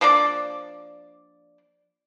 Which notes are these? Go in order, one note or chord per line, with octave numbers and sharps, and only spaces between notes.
F3 A#3 D4 D5